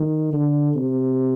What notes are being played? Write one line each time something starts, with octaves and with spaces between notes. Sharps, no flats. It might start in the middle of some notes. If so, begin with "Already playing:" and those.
Already playing: D#3
D3
C3